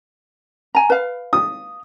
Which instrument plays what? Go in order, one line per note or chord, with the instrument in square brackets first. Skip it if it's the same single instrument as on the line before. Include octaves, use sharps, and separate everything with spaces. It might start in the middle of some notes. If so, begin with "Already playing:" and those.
[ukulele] G#5 A#5
B4 F5
[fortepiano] D#6